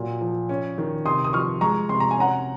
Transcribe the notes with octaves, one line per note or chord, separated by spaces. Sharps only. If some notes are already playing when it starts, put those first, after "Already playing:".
Already playing: A#2 F#3
F3
C#4
D#3
C3 C6 D#6
D#6
F3 C#6 F6
G#3 A#5 C#6
C3 C6
A#5
G#5
C#4 F#5 A#5